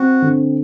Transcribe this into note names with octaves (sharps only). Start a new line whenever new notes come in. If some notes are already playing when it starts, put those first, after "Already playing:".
Already playing: C4 F#4
D3